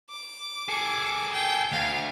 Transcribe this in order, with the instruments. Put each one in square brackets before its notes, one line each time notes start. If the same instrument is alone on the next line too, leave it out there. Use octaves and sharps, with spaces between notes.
[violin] D6
[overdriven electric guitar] G#4 A4
[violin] G5
[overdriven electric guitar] D2 [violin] F5